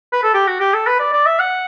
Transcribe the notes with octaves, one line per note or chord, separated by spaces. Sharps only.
B4
A4
G4
F#4
G4
A4
B4
D5
D5
E5
F#5